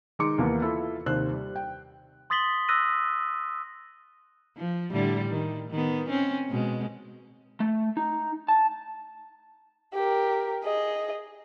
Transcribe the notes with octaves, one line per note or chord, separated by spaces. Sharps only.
D#3 G#3 D#4 C6 D6 C#7
D#2 E3 A#3 B3
E4 F4 A4 B5
D#2 C3 D#3 C5 F#6
G3
G5
C6 D#6 A6 B6 F#7 G7
D#6 E6 F#6 A#6 D#7
F3
A2 D3 G3
D#3
D#3 B3
C4 C#4
B2 G#3
A3
D#4
A5
G4 A#4
G#4 D#5